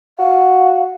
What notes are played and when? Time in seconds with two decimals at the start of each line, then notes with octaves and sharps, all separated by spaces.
0.19 F#4 F5